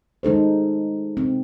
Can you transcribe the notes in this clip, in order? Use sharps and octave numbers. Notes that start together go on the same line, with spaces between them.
G#3 D#4 A4 C5
C4